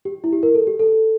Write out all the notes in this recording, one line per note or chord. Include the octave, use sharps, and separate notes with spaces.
G4
E4
G4
A#4
A4
G4
A4